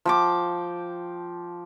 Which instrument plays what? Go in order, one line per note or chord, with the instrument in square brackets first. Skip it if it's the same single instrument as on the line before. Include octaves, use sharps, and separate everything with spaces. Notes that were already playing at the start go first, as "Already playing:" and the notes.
[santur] F3 G5 D6